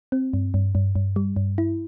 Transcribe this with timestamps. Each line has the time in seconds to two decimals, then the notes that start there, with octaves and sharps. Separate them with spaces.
0.12 C4
0.33 G2
0.54 G2
0.75 G2
0.95 G2
1.16 G3
1.36 G2
1.58 E4